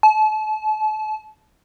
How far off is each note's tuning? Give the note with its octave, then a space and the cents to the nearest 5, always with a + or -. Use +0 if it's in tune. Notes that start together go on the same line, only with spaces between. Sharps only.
A5 -35